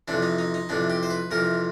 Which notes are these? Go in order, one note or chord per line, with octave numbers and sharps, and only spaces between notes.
F2 C3 E3 D4
D#4
D#4
D#4
F2 C3 E3 D4
G4
C5
B4
F2 C3 E3 A#4